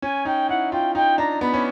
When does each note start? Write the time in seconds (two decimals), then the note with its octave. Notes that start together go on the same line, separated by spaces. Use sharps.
0.02 C#4 G#5
0.25 D#4 G5
0.49 E4 F#5
0.72 F4 G5
0.95 D#4 G5
1.18 D4 A#5
1.41 B3 B5
1.54 C#4